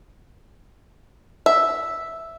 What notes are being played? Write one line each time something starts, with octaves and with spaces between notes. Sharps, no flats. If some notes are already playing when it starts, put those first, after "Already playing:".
E5